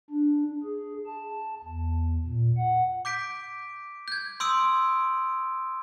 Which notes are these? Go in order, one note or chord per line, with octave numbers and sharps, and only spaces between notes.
D4
G#4
A5
E2
A#2
F#5
D6 G6 B6 D7
G6 G#6
C6 D#6 E6 G6 D7